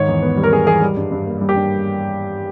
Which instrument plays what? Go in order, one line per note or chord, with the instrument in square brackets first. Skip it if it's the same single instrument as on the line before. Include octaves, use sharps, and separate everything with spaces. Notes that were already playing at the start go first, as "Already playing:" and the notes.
Already playing: [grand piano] G#2 D#3 C#5
E2
B3
G3
A#4
D#3 G#4
E2 G#4
G3
G2
G2
A#3
G3
G4
G2